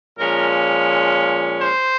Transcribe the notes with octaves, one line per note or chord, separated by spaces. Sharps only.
A#2 F3 G#3 C#4 A#4
C5